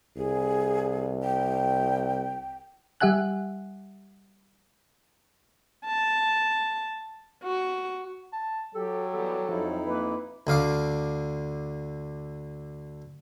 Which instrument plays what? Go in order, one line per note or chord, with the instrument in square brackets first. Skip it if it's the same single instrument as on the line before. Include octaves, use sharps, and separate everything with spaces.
[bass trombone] C2 [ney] G#4
[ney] G5
[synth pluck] G3 G4 E5 F#5 G#5 F#6
[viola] A5
F#4
[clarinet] A5
[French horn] F#3 [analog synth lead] G4 [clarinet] A4
[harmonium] E3 G3 B3 [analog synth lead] G4 [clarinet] A4
[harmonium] F2 D#4 E4 [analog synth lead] F3
[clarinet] A#3 [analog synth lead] B4
[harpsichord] D2 D3 F5 D6